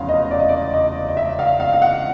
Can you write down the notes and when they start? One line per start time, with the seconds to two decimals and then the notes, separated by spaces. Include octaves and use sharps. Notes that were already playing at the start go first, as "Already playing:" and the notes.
Already playing: F1 E2 C#3 F5 F#5 B5 C6
0.09 D#5
0.31 D5
0.40 D#5
0.49 D5
0.74 D#5
1.08 D#5
1.17 E5
1.39 F5
1.60 F5
1.73 F5
1.82 F#5